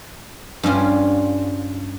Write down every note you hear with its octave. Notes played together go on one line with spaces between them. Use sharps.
G2 G3 C#4 F4